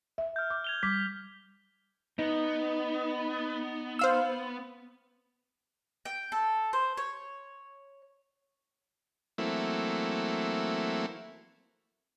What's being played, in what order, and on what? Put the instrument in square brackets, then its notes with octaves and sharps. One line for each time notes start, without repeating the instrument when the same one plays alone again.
[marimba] E5
[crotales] F6 G6
[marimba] D6
[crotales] G#6 F7 G7
[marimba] G3 D6 [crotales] B6
[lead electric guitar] B3 [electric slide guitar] D#4
[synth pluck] C5 F5 E6
[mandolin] G5
A4
C5
C#5
[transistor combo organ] E3 F#3 A3 A#3 C4 E4